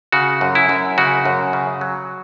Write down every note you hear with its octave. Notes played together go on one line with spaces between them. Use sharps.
C#3 F#4
F#2
E4
F#2
C#3 F#4
F#2
C#3
F#3